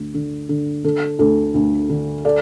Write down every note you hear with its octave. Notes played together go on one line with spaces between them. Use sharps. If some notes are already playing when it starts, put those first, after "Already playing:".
Already playing: D2 D3
D3
D3
D3 A4
D2 A4
D2
D3
A4 D5